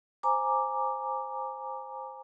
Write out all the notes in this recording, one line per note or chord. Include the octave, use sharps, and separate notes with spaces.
C5 G#5 A#5 D6